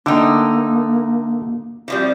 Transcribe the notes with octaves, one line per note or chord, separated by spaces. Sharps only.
D3 A3 A#3 D#4 G5
E3 F3 G3 C4